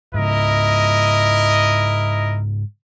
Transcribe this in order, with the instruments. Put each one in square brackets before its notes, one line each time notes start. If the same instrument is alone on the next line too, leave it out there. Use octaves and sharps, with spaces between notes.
[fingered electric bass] G#2 C#3 [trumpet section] E4 A#4 D#5